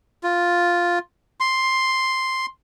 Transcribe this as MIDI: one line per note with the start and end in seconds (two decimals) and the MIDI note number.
0.23 0.99 65
1.40 2.46 84